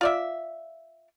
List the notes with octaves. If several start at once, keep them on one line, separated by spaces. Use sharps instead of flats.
F4 D5 E5